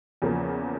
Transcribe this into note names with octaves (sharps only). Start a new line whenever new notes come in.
E2 C#3 F3 A#3